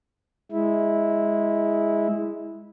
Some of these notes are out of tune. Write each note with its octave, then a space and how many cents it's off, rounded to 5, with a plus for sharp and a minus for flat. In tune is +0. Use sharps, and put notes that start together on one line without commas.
G#3 +0 E4 -10